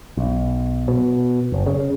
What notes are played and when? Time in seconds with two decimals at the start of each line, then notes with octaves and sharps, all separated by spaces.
0.17 B1
0.88 B2
1.52 F#1
1.66 C#3